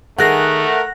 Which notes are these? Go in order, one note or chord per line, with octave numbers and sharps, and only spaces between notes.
D#3 A3 G#4 A#4 F#5 F#6 A#6